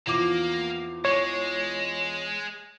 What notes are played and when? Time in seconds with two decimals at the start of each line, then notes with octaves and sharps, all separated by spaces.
0.07 E2 F3 A#3 D6
1.05 G#3 C#5